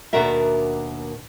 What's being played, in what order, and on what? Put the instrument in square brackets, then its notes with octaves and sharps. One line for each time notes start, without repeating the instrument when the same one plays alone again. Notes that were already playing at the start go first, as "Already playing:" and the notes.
[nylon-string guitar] D#2 B2 D4 F#4 A#4 E5